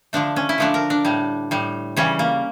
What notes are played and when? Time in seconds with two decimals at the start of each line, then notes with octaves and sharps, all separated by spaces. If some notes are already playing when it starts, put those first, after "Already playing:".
0.13 D3 F3 A3 D4
0.36 C#4
0.49 E4
0.58 D3 F3 A3 D4
0.74 A#4
0.90 D4
1.05 A2 G3
1.51 A2 G3
1.97 C#3 E3 G3 C#4
2.19 A#3